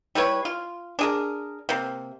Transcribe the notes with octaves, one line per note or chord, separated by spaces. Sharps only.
G3 E4 B4 C#5
F4
D4 G#4 A#4
C3 A#3